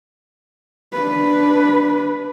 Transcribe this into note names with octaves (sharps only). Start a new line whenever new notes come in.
D4 B4